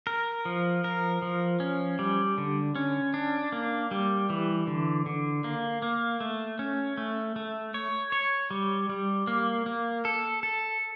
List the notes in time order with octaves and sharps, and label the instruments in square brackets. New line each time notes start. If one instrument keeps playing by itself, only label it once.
[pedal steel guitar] A#4
F3
A#4
F3
C#4
G3
D3
C#4
D4
A#3
G3
E3
D3
D3
A#3
A#3
A3
C#4
A3
A3
C#5
C#5
G3
G3
A#3
A#3
A4
A4